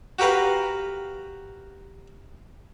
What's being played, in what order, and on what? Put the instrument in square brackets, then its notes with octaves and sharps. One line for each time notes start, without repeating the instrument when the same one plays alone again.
[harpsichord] F#4 G4 A#4 B4 F5